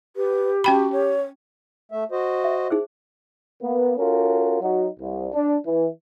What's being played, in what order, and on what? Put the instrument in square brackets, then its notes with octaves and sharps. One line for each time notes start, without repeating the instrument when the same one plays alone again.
[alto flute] G4 [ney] B4
[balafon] C#4 G5 B5 [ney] F#4
[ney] C#5
[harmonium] A3 E5
F#4 C5 D#5
[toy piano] E5
D#4 G#4 C5
[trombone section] A#3 B3
C#4 F4 F#4 A4 A#4
F#3 D#4 F#4
C2
D4
E3